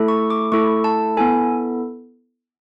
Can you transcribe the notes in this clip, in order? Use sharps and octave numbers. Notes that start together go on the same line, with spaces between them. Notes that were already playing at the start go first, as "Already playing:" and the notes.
Already playing: A3 E4 A4
C#6
D6
A3 E4 A4 C#6
A5
B3 E4 A4 G#5